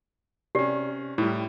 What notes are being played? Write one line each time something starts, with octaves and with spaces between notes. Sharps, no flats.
C3 C#4 G4 D5
A2 G3 E4